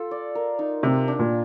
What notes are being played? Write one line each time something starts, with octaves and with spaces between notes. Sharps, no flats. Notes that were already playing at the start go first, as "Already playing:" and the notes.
Already playing: F4 A4
D5
A#4
D#4
C3 G4
D4
A#2